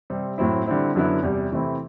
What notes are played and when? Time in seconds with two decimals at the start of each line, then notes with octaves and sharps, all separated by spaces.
0.10 C3 G3 C4
0.38 A2 F#3 C4 E4
0.66 D3 G3 C4 E4
0.95 F#2 D3 F#3 B3 E4
1.23 E2 C3 G3
1.52 C3 E3 A3 C4 E4